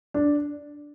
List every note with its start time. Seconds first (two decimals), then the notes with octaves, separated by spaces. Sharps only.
0.14 D4